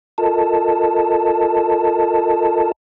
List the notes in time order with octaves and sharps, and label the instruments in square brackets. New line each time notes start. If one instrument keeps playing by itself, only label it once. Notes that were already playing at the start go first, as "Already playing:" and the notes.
[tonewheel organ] F4 A4 A#4 D#5 A5